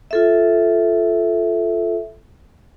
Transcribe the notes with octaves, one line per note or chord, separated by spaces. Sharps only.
F4 A4 E5